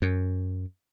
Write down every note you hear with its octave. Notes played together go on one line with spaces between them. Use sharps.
F#2